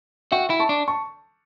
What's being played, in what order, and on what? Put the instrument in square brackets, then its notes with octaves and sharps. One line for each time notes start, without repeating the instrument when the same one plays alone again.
[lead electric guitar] F#4 [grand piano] E5 G5
[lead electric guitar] E4
[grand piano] A5 C#6
[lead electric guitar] D4
[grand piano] A5 C#6